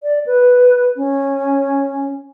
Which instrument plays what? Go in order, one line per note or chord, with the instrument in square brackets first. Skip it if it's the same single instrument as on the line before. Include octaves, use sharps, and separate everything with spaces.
[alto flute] D5
B4
C#4